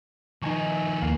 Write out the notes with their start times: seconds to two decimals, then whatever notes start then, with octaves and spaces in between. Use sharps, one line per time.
0.42 D#3 F3 D#4 G#5 C#6
0.64 E5
1.02 D#2 A#3 F5